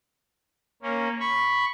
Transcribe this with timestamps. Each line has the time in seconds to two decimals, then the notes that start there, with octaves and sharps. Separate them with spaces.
0.82 A#3 C#4
1.20 B5 C#6